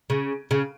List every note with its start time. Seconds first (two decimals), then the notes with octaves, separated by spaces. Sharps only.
0.10 C#3
0.51 C#3